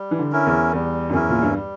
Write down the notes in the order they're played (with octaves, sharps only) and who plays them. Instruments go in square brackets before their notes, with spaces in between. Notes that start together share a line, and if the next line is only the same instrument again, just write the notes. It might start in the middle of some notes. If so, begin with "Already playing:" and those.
Already playing: [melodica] G3
[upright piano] E3
D3
[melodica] C#4 E4 A#4
[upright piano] E2
[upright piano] E2 [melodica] G3
[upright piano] F#2
[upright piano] E2 [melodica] C#4 E4 A#4
[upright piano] A#2
G2
[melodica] G3